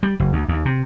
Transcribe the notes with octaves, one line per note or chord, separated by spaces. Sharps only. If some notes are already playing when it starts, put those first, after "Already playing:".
G3
F#1
D2
D#2
C3